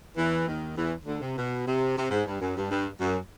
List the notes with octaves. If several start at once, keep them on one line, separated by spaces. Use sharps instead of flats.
E2 E3
D#2 D#3
E2 E3
D2 D3
C3
B2
C3
C3
G#2
G2
F#2
G2
G2
F#2